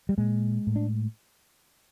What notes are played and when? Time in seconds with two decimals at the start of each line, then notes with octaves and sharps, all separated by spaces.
0.09 G3
0.18 A#2 G#3
0.67 A2
0.76 D4